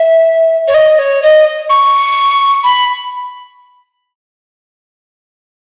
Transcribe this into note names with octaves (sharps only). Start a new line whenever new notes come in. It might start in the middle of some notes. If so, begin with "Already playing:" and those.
Already playing: E5
C#5
D#5
C#5
D#5
C#6
B5